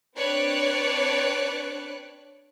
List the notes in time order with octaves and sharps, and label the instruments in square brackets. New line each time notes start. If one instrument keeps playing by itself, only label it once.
[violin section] C4 D4 B4 C#5 D5 F#6